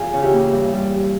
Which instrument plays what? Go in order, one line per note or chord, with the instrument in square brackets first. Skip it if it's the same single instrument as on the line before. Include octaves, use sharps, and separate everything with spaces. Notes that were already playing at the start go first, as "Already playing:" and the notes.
Already playing: [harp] E2 F4 G#4
C#3
E4 G4
A#3
G2
G3
G2